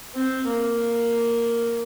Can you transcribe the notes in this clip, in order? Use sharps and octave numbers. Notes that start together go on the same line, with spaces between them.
C4
A#3